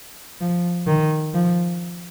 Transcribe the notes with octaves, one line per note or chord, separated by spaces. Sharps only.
F3
D#3
F3